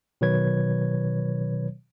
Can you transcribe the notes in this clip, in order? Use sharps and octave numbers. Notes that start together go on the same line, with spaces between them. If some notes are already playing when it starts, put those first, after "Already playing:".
B2 D#3 F#3 B4 C#5 G#6